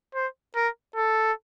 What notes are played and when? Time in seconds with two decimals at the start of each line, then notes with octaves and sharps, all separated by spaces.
0.15 C5
0.56 A#4
0.96 A4